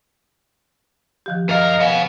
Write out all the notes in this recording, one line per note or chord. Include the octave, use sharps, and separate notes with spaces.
D#3 F3 G4
F#2 A#4 D#5 F5
B3 C#5 F5